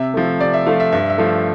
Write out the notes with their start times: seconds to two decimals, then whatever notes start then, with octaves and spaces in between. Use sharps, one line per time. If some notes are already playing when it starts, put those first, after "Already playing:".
Already playing: C3 E5
0.14 F3 A3
0.40 C3 D5
0.54 E5
0.66 F3 A3 F5
0.80 E5
0.92 G2 E5
1.10 E5
1.18 F3 A3